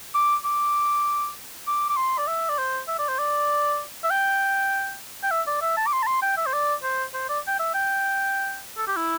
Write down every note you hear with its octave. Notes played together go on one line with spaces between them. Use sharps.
D6
D6
D6
D6
C6
D5
E5
D5
C5
E5
D5
C5
D5
E5
G5
G5
E5
D5
E5
A5
D6
C6
A5
C6
G5
E5
C5
D5
C5
C5
D5
G5
E5
G5
A4
G4
E4